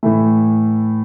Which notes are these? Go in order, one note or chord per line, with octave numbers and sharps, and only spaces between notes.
A2 E3 A3